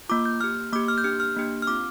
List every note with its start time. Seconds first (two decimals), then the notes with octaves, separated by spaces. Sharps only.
0.09 A#3 F4 D6
0.26 G6
0.41 A#3 G4 F6
0.73 A#3 D6
0.76 G4
0.88 F6
0.98 G6
1.04 A#3 D4 G4 F6
1.20 F6
1.37 A#3 D4 G4
1.62 F6
1.67 C4 F4 D6